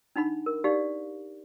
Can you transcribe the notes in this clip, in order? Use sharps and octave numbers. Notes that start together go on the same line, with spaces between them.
D4 D#4 F#5 B5
A#4
D#4 G4 D5 F5